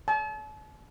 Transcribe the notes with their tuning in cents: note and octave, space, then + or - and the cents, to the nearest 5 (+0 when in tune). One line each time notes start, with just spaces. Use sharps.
A5 -40